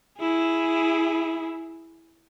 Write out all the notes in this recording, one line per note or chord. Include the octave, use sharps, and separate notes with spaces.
E4 G#4